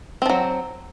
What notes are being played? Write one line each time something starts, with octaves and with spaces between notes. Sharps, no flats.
F3 F#3 C4